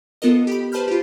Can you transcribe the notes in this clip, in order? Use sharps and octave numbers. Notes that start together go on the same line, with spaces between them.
B3 F4 A4 A#4 D#5
G4 B5
B4 C5 A5 B5 F6 G6
F4 G4